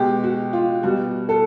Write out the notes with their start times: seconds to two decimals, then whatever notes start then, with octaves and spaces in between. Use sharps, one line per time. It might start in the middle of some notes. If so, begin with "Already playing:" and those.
Already playing: B2 G#3 G4
0.24 F#4
0.53 F4
0.83 B2 G3 F#4
1.29 A4